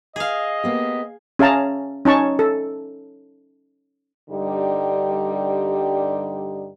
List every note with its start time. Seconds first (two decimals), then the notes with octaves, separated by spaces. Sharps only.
0.16 G#4 D#5 F5
0.64 A#3 B3 G4
1.39 C#4 G#4 E5 F5 A5 A#5
2.05 C#4 D#4 A5 C#6
2.39 A4
4.29 G2 D3 G3 D#4 G4